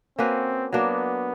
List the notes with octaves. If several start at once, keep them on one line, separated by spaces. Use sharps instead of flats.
A#3 C4 C#4 F#4 B4
F#3 A#3 B3 D4